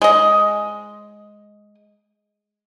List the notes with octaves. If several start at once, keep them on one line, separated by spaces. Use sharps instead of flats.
G#3 D#5